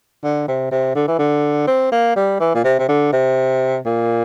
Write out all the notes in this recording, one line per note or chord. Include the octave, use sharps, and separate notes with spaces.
D3
C3
C3
D3
E3
D3
C4
A#3
G3
E3
A#2
C3
C3
D3
C3
A#2